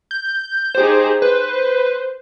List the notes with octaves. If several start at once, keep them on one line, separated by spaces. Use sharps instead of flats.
G6
D#4 G4 G#4 C5
B4 C5